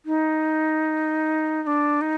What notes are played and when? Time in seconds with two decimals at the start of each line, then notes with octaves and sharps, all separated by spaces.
0.05 D#4
1.63 D#4
1.67 D4
2.01 D#4